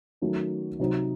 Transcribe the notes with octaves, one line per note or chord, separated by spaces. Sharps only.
D#3 F#3 A3 C#4 F#4
C3 F#3 C4 D#4 F#4